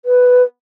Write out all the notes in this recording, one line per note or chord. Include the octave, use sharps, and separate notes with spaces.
B4